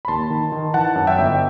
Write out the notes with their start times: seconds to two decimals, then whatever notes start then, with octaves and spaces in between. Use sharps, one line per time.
0.05 B5
0.08 D#2 A5 C6
0.30 D#3
0.52 D#3
0.74 E3 F#5 A5
0.96 F#2
1.07 E5 G5
1.18 G1